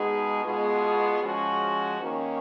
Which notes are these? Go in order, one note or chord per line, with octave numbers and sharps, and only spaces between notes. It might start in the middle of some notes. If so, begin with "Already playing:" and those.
Already playing: B2 G#3 B3 D#4 G#4
B2 G#3 B3 F4 G#4
F3 G#3 C#4 F#4
D#3 A#3 C#4